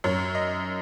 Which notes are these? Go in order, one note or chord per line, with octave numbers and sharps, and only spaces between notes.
F#2 C#5
D#5